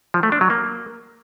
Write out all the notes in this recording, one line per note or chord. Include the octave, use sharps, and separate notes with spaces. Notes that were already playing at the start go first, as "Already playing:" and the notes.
F3
A3
D4
F#3
A#3